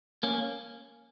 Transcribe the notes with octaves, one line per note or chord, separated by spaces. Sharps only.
A#3 C#4